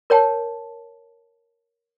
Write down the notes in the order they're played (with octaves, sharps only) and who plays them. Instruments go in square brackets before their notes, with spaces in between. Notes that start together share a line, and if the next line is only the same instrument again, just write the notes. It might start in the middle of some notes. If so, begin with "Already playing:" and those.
[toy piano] A#4 C#5 G5 A5